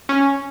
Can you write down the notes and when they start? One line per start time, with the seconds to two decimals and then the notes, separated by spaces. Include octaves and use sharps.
0.09 C#4